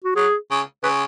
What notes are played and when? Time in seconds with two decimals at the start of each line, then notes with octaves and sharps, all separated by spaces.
0.04 F#4
0.16 F#3 G#4
0.51 C#3
0.83 C#3 B4